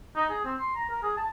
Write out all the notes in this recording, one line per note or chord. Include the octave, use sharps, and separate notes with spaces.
D#4
G#4
C4
C6
A#5
A#4
G#4
A5